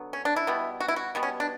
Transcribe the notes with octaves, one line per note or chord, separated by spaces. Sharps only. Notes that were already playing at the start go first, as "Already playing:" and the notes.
Already playing: D3 F#3 B3
C#4
D4
E4
B2 G3 B3
F#4
E4
F#4
B2 G3 B3
C#4
D4